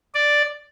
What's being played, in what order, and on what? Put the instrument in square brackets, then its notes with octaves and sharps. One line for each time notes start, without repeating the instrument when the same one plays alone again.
[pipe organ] D5